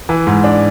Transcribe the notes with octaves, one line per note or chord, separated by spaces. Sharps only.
E3
G#2
D4